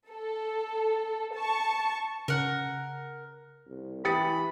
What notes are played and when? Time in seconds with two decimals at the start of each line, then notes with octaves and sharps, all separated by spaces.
0.12 A4
1.36 A5 C#6
2.28 C#3 A#4 F#5
3.67 C2
4.05 E3 G4 B5 D#6 A6 C#7